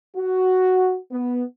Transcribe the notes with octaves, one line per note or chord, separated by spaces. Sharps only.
F#4
B3